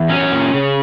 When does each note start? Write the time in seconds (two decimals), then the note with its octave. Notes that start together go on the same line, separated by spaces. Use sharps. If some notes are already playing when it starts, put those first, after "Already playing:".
Already playing: E2
0.09 F#3 C#4
0.32 A#2
0.54 C#3